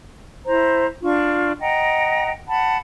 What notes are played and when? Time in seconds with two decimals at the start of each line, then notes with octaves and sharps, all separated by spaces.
0.46 E4 C5 A#5
1.02 D4 F4 C#6
1.60 D#5 F#5 G5 A#5
2.47 F#5 A5 B5